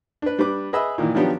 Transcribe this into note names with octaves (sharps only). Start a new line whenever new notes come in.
D4 B4
G3 D4 B4 D6
G#4 B4 D#5 E5 B5 E6
A#2 D#3 E3
D#3 F3 F#3 B3 D4 G4